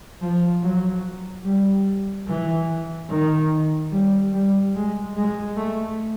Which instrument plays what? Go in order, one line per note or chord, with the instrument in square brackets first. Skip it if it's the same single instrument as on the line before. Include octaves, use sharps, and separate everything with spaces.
[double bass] F3
F#3
G3
E3
D#3
G3
G3
G#3
G#3
A3